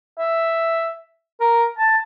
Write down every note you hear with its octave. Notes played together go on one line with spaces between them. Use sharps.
E5
A#4
A5